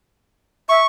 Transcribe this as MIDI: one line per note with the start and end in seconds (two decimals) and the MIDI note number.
0.69 0.80 76
0.69 0.87 85